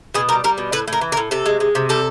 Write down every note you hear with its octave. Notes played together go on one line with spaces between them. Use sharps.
B2 G#4
G3 A#4
G3 A#4
B2
A2 B4
A2
A#4
E3
A#4
A2
C3 A4
G#3
G#3
C3
G3 A4